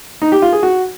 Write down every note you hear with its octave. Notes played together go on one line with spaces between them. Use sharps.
D#4
G4
F4
G#4
F#4